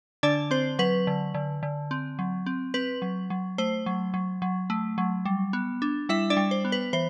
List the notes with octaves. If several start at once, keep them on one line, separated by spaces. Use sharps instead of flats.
D3 D4 D5
C4 C5
F#3 B4
D3
D3
D3
C4
F#3
C4
C4 B4
F#3
F#3
A3 C5
F#3
F#3
F#3
A3
F#3
G3
B3
D4
G3 E4 E5
D4 D5
G3
C5
B3
B4
E3 C5